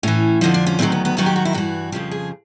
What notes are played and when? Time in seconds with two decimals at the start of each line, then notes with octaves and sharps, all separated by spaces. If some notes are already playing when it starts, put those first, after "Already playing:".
0.03 A2 E3 C#4
0.41 F2 D3 F3 D#4
0.54 D4
0.66 C#4
0.79 D2 C3 D#3 F#3 C4
0.92 B3
1.05 B3
1.17 D#2 D#3 F#3 C#4
1.26 G4
1.36 F#4
1.45 E4
1.54 G2 E3 F#4
1.92 F2 C#3 F3 G4
2.11 G#4